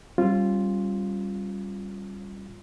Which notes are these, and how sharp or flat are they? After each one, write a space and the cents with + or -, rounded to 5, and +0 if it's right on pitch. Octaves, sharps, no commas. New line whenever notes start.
G3 +0 C#4 -40 F4 +0